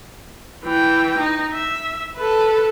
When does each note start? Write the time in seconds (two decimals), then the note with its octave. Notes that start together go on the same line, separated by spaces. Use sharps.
0.64 E3 G5
1.19 D#4
1.53 E5
2.17 A4 B4